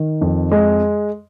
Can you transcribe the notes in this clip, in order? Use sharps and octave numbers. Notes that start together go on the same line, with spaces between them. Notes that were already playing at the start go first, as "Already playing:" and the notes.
Already playing: D#3
F2
G#3